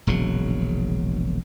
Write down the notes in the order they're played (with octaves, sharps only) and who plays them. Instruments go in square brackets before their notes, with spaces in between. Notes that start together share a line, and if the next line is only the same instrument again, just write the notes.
[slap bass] E1 A#1 C#3 F#3